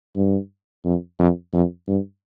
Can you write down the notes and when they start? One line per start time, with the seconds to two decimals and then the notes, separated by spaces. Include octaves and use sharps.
0.16 G2
0.85 F2
1.19 F2
1.53 F2
1.88 G2